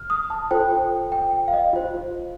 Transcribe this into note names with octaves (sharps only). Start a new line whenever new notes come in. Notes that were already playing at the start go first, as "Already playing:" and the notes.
Already playing: F6
D#6
A5
F4 A4 C5 G5
G5
F5
D#5
F4 C5